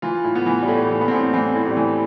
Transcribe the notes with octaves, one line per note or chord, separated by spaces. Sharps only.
E3 F4
A2
B3
E3
G3
A2 A3
E3
B3
C4
A2 B3
E3 C4
A2
G3
E3